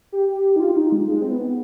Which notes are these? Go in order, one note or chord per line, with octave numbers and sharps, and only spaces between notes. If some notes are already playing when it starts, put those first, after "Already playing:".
G4
D#4
F4
D#4
G#3
G#3
C4
B3